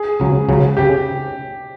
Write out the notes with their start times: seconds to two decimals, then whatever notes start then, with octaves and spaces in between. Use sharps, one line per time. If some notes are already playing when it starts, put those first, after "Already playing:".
Already playing: G#4
0.20 C#2 C#3 F#3
0.49 C#2 C#3 F#3
0.77 C#3 G4